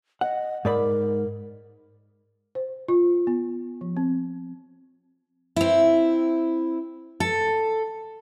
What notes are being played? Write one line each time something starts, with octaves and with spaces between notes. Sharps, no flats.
D#5 F#5
G#2 A#4 D5 B5
C5
F4
B3
F3
C4
C4 E4
A4